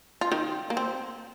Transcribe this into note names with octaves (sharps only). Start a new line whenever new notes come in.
F4
D#3 D#4
A#3
C4